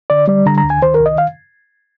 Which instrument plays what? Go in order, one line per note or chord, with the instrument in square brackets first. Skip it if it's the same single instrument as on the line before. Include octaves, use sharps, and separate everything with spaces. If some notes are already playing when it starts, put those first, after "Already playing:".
[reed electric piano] D3 D5
G3 D5
D3 A#5
A#5
D2
G#5
D#3 C5
A#4
C2
D#5
F5